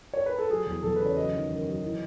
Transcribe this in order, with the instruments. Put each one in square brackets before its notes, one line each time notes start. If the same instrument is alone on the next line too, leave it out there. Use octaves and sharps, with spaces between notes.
[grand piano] C#5
B4
A4
F#3 G#4
E2
E2 A4
C#3 B4
C#5
F#3 D#5
D#3
F#2
F#3
E3